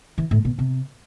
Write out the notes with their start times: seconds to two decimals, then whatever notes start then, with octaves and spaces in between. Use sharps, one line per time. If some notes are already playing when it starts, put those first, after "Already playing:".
0.18 E3
0.31 A2
0.45 B2
0.59 C3